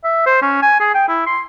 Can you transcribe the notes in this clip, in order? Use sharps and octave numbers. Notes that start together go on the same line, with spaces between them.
E5
C5
C#4
G#5
G#4
G5
E4
C6